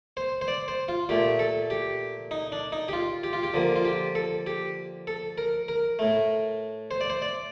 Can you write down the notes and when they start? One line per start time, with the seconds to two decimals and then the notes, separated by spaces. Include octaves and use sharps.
0.17 C5
0.41 C5
0.48 D5
0.68 C5
0.88 F4
1.09 A#2 A3 G4
1.39 A4
1.70 G4
2.31 D#4
2.52 D4
2.72 D#4
2.88 G4
2.93 F4
3.24 G4
3.33 F4
3.43 G4
3.54 D3 F3 A#3
3.76 F4
3.85 G4
4.15 A4
4.46 G4
5.07 A4
5.38 A#4
5.68 A#4
5.99 A2 A3
6.91 C5
7.01 D5
7.10 C5
7.22 D5